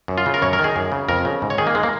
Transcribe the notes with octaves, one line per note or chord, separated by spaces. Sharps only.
F#2
F4
C#3
A#4
F#2 C#5
A#4
D#3
G#4
F#2
C#3
F2 A#4
C#3
G#2
C#5
D#3 G#4
A#3
G#3
A#3